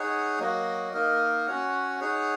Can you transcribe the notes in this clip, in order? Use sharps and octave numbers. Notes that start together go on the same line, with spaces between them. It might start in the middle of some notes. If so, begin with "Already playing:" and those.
Already playing: D#4 G#4 C#5 F#5
F#3 A#3 F#4 D#5
A#3 D#4 A#4 D#5
C#4 F#4 C#5 F#5
D#4 G#4 C#5 F#5